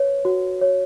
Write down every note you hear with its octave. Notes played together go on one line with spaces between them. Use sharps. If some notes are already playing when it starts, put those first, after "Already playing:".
Already playing: B4 C#5
F#4
C#5